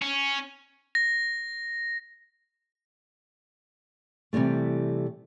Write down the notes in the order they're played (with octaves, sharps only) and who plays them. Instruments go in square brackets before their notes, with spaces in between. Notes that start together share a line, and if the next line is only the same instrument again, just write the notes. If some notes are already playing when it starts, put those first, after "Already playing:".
[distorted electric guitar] C#4
[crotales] A#6
[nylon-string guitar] C3 D#3 E3 G3 A3